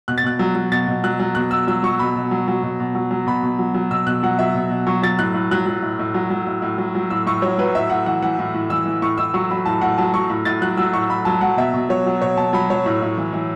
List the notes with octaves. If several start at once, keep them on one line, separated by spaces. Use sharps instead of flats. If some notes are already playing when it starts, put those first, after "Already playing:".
B2 F#6
A6
B2 F#6
F#3
F#3
B2 A6
B2
F#3 F#6
F#3
B2 F#6
B2 E6
F#3 E6
F#3 C#6
B2 B5
B2
F#3
F#3
B2
B2
F#3
F#3
B2 B5
B2
F#3
F#3
B2 E6
B2 F#6
F#3 F#5
F#3 E5
B2
B2
F#3 C#6
F#3 A6
A2 F#6
A2
F#3 F#6
F#3
A2
A2
F#3
F#3
A2
A2
F#3
F#3
A2 E6
A2 C#6
F#3 C#5
F#3 B4
A2 E5
A2 F#5
E3 F#5
E3 F#5
A2
A2
E3 E6
E3
A2 C#6
A2 E6
F#3 C#6
F#3 B5
A2 A5
A2 F#5
F#3 A5
F#3 C#6
A2
A2 A6
F#3 F#6
F#3 E6
A2 C#6
A2 B5
F#3 A5
F#3 F#5
B2 E5
B2
F#3 C#5
F#3
B2 C#5
B2 A5
F#3 B5
F#3 C#5
A2
A2
E3
E3